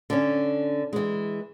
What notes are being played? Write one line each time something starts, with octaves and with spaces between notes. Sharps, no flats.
D3 C#4
E3 G#3